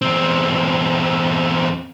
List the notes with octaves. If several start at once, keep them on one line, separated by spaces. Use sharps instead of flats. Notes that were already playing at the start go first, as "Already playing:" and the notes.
E2 C4